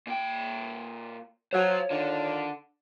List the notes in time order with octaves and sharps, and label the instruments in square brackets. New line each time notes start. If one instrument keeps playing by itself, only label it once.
[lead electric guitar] A#2 G5
[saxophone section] F#3 [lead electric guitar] C5 F5 [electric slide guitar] C#5
[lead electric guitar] D3 [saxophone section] D#3 F4 D5